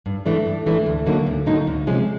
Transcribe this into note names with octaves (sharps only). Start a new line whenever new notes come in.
G2
E3 A3 D4
G2
E3 A3 D4
D2
D3 F#3 A#3 D#4
D2
D3 F#3 A#3 D#4
D2
C3 F3 G#3 C#4